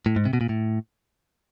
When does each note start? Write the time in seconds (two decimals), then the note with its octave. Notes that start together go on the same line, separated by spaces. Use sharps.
0.06 A2
0.16 G#2
0.25 C3
0.33 B2
0.41 A#2
0.49 A2